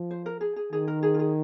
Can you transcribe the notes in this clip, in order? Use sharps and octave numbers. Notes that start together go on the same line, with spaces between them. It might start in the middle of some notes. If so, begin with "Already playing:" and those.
Already playing: F3
C5
A#4
G#4
G#4
D#3 G#4
A#4
G#4
F4
G#4